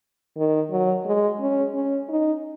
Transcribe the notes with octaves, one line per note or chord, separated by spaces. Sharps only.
D#3
F#3
G#3
C#4
C#4
D#4